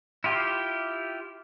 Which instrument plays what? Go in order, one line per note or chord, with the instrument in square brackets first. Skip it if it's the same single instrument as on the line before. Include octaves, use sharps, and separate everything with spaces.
[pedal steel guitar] E4 F4 G4